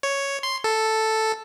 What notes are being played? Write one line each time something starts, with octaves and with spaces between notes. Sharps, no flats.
C#5
C6
A4